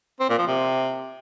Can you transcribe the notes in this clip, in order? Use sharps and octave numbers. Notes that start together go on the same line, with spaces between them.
C4
A#2
F3
C3